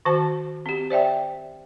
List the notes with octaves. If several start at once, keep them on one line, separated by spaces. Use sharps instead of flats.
D#3 F#4 C5 A5
C4 G4
C5 D5 E5 G5